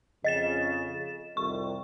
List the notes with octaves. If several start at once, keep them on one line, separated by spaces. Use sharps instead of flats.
F2 C#3 D#5 A6 E7
C2 F2 D#3 C#6